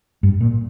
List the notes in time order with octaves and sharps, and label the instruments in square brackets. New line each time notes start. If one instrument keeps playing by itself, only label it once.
[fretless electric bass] G2
A#2